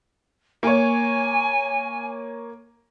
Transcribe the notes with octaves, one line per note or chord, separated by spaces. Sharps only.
A#3 C#5 G#5